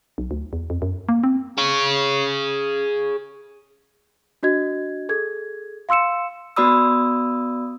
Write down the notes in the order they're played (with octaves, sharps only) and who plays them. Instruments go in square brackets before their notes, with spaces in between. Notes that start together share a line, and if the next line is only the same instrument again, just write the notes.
[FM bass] B1
D2
E2
F2
F#2
A#3
C4
[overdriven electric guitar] G#4 C#5
[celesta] D4 F#4 D#5 G#6
G#4 A4 G#6
F5 C6 E6 C#7 E7
[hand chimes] B3 F#4 D5 B5 D#6 E6